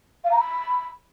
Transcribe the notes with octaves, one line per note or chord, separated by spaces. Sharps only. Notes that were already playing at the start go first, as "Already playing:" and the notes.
F5
A#5
B5